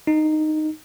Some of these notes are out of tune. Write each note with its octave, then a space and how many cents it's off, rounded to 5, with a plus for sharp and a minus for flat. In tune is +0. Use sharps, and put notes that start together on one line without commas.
D#4 -10